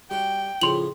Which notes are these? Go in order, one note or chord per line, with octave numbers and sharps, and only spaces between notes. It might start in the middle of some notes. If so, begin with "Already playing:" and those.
G3 F#4 G5
A2 C#3 F3 C6 F#7